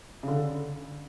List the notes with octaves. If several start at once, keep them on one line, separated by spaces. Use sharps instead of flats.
C#3
D3